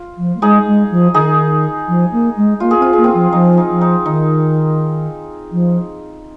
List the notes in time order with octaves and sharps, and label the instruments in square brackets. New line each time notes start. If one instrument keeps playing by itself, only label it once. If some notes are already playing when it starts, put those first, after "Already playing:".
Already playing: [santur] F4
[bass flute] F3
A#3
[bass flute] G#3 [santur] D#4 G#4
[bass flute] G#3
F3
[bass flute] D#3 [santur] D#4 G#4
[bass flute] F3
A#3
G#3
[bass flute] A#3 [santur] F4
[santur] G#4
[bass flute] C4 [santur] F4
[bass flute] A#3 [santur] G#4
[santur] C4 F4
[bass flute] F3
[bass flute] F3 [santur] D#4
[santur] D#4
[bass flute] F3
[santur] D#4
[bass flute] D#3 [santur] D#4
[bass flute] F3